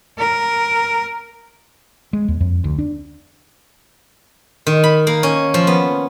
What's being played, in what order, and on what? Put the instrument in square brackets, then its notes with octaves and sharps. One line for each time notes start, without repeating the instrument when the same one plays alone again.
[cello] A#4
[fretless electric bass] G#3
D#2
F2
D2
D4
[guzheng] D#3
B5
A#3
C#4
F3
B3